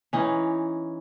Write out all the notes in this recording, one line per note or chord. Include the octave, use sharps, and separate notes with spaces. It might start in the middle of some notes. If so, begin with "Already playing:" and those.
E3 C#4 D#4